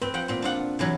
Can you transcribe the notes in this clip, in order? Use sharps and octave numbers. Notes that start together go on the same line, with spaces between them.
C4 B4
F3 F#5 G5
A#2 C4
D4 F4 F#5
C3 E3 F#3